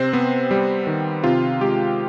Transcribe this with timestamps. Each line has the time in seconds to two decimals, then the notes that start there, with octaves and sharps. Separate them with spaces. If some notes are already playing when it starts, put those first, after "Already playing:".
Already playing: C3 C4 C5
0.13 B3
0.51 G3
0.87 D#3
1.24 C3 F4
1.61 G#3 G4